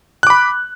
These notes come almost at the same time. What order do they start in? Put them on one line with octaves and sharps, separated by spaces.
F#6 D6 B5